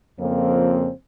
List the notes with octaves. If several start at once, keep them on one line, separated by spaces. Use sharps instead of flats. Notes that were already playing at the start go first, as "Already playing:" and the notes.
F2 C#3 F3 A#3 C4